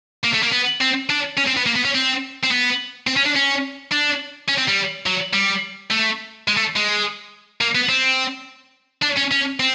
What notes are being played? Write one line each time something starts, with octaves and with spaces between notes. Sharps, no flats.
A#3
A3
A#3
B3
C4
D4
C#4
C4
B3
A#3
B3
C#4
C4
C4
B3
C4
C#4
D4
C#4
D4
C#4
C4
G3
F#3
G3
A3
G#3
A3
G#3
A#3
B3
C4
D4
C#4
C#4
C4